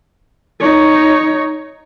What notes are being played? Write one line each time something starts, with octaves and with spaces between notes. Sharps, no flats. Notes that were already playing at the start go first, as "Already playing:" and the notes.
D#4 C#5